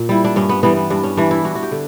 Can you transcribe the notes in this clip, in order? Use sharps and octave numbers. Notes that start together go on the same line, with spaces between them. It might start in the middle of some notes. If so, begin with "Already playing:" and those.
Already playing: A#2
G3 E4
D4
G2 C#4
B3
E3 G3 B3
B3
G2 D4
C#4
E3 G3 D4
E4
G2 F#4
F#4
G4
D3